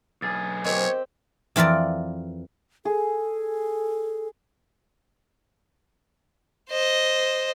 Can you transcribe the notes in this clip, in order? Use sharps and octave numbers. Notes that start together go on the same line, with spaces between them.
B1 G#4 A6
C4 G4 A#4 C5 C#5 D#5
F2 E3 F4 A#4 D5
G#4 A4
C5 D#5